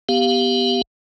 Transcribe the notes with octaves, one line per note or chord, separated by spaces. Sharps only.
B3 G4 F5